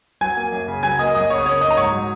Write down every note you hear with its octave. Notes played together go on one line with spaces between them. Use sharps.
F#3 G#5 G#6
A#3
F#2
C#3
F#3 G#5 G#6
A#3 D#5 D#6
F#2 D#5 D#6
C#3 C#5 C#6
D#6
A#3 C#5 C#6
D#4 D#5 D#6
A#5
G#2 C#5 C#6
F#3